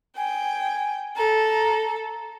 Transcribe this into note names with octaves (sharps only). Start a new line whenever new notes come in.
G5 G#5
A4 A#5